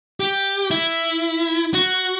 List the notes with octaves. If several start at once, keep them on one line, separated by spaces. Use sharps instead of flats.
G4
E4
F#4